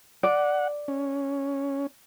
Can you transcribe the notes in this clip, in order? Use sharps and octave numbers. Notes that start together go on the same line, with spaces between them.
D5 F#5
C#4